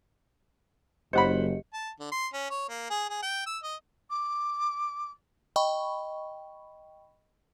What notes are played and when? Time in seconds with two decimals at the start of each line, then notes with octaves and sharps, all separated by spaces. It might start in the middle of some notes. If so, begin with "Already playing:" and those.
1.13 F#1 G4 C5 D#5 F#5 B5 C#7
1.74 A5
2.00 D3
2.12 C6
2.33 C#4
2.51 C#5
2.69 A#3
2.90 G#4
3.10 G#4
3.22 G5
3.46 E6
3.63 D#5
4.10 D6
5.56 D#5 G5 B5 C#6